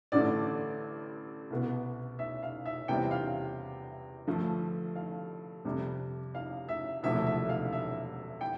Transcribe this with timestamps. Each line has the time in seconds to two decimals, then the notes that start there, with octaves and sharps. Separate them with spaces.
0.12 A1 G2 D3 A3 D5
1.50 C2 B2 B3
2.19 E5
2.43 F5
2.66 E5
2.88 E2 C3 G3 C4 G5
3.11 F5
4.27 G2 D3 F3 A3
4.96 F5
5.65 F2 C3 G3 D4
6.35 F5
6.69 E5
7.03 E1 D2 C3 F3 A3 E5
7.26 E5
7.49 F5
7.73 E5
8.41 G5